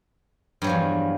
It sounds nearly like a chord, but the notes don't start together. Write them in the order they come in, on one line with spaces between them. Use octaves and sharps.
G2 F#3 F3 E2